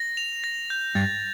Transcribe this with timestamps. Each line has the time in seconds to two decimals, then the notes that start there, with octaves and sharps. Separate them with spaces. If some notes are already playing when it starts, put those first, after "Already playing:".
Already playing: A#6
0.17 F7
0.44 A#6
0.70 G6
0.95 G2 A6